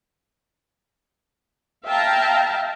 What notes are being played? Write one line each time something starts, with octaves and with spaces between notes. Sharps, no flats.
E5 F5 G5 A5 A#5